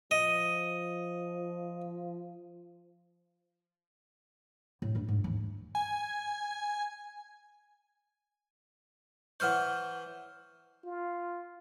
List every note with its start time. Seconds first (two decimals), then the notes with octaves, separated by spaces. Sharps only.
0.11 F3 D#5
4.82 A2
4.95 G2 A3
5.08 G#2
5.24 D#2 E3
5.75 G#5
9.40 E3 C5 C#5 F#5 F6 G6
10.84 F4